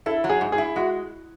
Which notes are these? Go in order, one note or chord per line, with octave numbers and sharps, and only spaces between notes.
E4 A4
F#3
G#4
G#2
G#4
E4
G#3 F#4